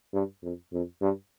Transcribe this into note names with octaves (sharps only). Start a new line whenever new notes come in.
G2
F2
F2
G2